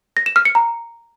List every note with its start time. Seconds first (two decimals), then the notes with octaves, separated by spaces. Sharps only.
0.17 A#6
0.26 E7
0.36 F6
0.45 C#7
0.55 A#5